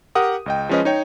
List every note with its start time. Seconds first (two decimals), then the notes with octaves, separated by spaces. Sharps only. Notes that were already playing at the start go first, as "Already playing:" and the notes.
0.15 G4 A#4 F#5 D#6
0.46 C#2 D#5 G5
0.69 F3 G#3 C#4 B4 D#5
0.85 D#4 C#5 G5